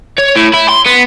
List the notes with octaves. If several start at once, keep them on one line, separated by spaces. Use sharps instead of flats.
C#5
A2
E4
C6
B3